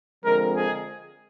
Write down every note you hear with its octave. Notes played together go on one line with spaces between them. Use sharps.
D3 F3 G#3 C4 A#4
G#4